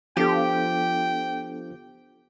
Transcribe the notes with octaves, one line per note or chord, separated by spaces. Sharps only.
F3 B3 D4 G4 A4 G5